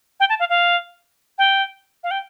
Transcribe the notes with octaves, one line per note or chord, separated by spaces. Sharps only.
G5
A5
F5
F5
G5
F5
G5